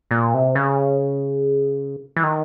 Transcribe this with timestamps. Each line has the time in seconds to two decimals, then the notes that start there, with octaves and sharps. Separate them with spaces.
0.11 A#2
0.34 C3
0.55 C#3
2.16 E3
2.23 D#3